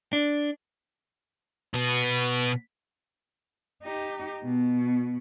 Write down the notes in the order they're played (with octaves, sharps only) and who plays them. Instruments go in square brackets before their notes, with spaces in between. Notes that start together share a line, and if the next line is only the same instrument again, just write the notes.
[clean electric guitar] D4
[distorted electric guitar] B2 B3
[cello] D#4 G4
B2